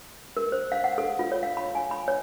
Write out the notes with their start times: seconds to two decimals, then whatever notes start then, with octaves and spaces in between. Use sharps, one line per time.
0.37 A#4
0.52 C5
0.72 F5
0.84 F#5
0.98 A4
1.19 F4
1.32 C#5
1.43 F5
1.57 B5
1.75 G#5
1.91 B5
2.08 C#5